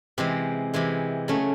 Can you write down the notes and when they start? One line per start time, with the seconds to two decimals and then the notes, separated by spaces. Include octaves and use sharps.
0.18 C3 E3 G#3 C4
0.74 C3 E3 G#3
1.28 C#3 F#3 A3 C#4